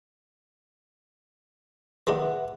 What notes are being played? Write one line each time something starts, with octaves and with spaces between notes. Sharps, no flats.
D#3 G#3 D4 B4 E5 F#5